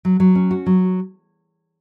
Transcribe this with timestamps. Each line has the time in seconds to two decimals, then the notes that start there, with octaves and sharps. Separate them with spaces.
0.05 F#3
0.20 F#3
0.35 C#4
0.51 F#4
0.66 F#3